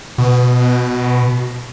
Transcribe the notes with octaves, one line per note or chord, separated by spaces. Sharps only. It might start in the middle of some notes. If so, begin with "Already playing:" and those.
B2